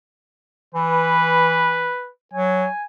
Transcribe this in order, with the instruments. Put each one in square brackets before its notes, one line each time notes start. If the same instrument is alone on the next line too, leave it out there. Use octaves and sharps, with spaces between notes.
[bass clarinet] E3 [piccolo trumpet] B4
[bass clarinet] F#3 [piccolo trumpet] G#5